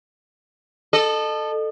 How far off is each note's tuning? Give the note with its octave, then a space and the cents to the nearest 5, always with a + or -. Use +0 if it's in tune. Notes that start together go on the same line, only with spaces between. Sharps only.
A4 +0 D#5 -35